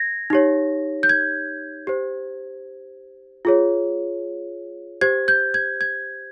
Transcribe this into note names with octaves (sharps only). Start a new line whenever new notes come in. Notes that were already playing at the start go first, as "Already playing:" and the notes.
Already playing: G#6 A#6
D#4 G4 C#5
G6
G#6
G4 C5
F4 G#4 C#5
G4 C5 G#6
G6
G#6
G#6